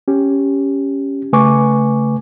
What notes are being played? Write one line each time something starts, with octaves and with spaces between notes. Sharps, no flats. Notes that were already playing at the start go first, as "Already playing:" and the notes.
C#4 G4
C#3 A3 B4 G#5 C#6 D6